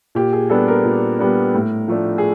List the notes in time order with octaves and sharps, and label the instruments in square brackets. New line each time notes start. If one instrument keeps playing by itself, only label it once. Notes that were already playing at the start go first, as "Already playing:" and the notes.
[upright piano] A#2 G4
G#4
G3 B3 D4 A4
A#4
A#2
G3 B3 D4
A2
F3 A3 D4
G#4